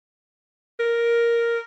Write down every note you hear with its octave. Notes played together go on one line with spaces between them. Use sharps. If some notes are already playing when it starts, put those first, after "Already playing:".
A#4